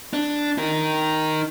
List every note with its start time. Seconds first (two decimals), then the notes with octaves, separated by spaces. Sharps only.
0.13 D4
0.58 D#4 A#4